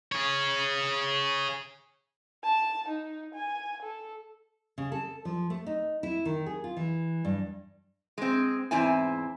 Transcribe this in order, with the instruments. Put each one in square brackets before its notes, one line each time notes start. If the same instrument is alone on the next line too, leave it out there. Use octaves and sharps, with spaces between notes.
[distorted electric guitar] G#4 C#5
[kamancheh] A5
D#4
G#5
A4
[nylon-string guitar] C#3
A4
F3
A3
D#4
E4
D#3
G#4
F4
E3
G2
[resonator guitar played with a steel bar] G#3 C4
E2 G#2 C4 E4 G#5